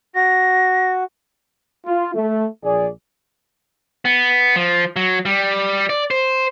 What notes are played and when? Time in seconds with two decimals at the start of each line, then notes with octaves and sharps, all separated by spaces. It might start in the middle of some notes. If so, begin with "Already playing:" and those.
0.15 F#4 A#6
1.85 F4
2.15 A3
2.63 A#1 G#4 D5
4.05 B3
4.56 F3
4.96 F#3
5.25 G3
5.89 D5
6.11 C5